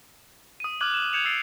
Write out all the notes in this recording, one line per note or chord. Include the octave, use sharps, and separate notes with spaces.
D#6 D#7
D6 F6 F#6 G#6 F#7
E7
G6 G#6 C#7 E7 F7
E6 A6 C7 D7